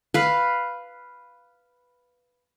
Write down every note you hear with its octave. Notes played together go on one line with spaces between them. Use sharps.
B4 F5